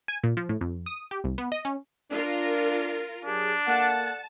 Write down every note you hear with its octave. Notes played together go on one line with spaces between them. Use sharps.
G#5
A#2
F3
A2
F2
D#6
G4
C2
B3
D#5
C#4
D4 F4 A#4
F#3 D4 G4 G#4
A#3 A4 D5 F#5 A5